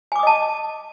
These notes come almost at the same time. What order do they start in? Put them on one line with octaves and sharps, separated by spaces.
G#5 D6 D#6 D#5 A5